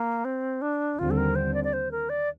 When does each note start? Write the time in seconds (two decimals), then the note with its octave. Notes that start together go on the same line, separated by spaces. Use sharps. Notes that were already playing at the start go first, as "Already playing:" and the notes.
Already playing: A#3
0.25 C4
0.62 D4
0.98 D#2 D3 G3 C4 F4
1.11 A4
1.17 A#4
1.35 C5
1.54 D5
1.64 D5
1.73 C5
1.91 A#4
2.09 D5